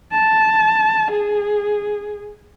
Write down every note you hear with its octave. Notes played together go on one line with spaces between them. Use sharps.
A5
G#4